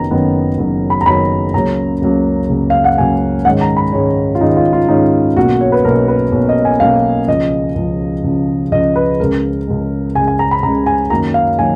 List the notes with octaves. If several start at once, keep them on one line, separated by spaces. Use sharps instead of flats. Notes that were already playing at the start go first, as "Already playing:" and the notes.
Already playing: F#1 F#2 D#3 F#3 B3 A#5
F#1 F#2 D#3 F#3 B3
F#1 F#2 D#3 F#3 B3
B5
A#5
F#1 F#2 D#3 F#3 B3 B5
C#2 C#3 F#3 A#3 C#4 A#5
C#2 C#3 F#3 A#3 C#4
C#2 C#3 F#3 A#3 C#4
F5
F#5
C#2 C#3 F#3 A#3 C#4 G#5
G#2 D#3 G#3 C#4 F#5
A#5
B5
G#2 D#3 G#3 C#4 C#5
F4
G#2 D#3 G#3 C#4 D#4
F4
F4
G#2 D#3 G#3 C#4 D#4
B1 B2 A#3 C#4 F#4
C#5
B4
B1 B2 A#3 C#4 A#4
B4
B1 B2 A#3 C#4 C#5
D#5
G#5
B1 B2 A#3 C#4 F5
C#2 C#3 F3 D#5
C#2 C#3 F3
C#2 C#3 F3
C#2 C#3 F3 D#5
B4
C#2 C#3 G#3 A#4
C#2 C#3 G#3
C#2 C#3 G#3 G#5
G#5
A#5
B5
C#2 C#3 G#3 A#5
G#5
F#2 D#3 F#3 A#3 A#5
F5
D#3 F#3 A#3 G#5